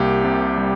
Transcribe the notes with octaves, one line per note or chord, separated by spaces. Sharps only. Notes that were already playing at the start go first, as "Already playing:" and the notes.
Already playing: C2 A#3 G4
C3
G3